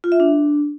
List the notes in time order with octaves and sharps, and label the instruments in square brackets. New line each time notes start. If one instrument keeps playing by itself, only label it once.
[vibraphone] F4
E5
D4